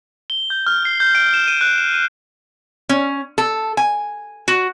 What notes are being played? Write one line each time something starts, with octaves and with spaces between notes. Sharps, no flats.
G7
G6
F6
C7
G6
D7
E7
D#7
F#6
E7
D#7
C#4
A4
G#5
F#4